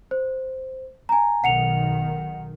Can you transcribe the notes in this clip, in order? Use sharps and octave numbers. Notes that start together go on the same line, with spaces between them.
C5
G#5 A#5
B1 D#3 F#5 C#7 F7